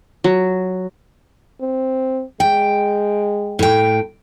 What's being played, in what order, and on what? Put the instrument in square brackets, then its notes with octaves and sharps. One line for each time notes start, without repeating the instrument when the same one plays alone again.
[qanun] F#3
[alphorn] C4
[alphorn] G#3 [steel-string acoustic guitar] G5
[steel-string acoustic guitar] A2 G5